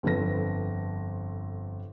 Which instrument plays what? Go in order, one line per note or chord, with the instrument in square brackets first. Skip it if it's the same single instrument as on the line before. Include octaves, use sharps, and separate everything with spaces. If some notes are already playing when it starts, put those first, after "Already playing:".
[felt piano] G1 F2 C4 A4 B4 A#6